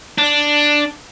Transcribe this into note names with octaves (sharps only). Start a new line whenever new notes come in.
D4